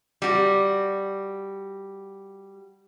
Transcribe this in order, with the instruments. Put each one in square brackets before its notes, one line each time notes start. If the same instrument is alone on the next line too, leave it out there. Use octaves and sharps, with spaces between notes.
[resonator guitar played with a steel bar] G3 F#4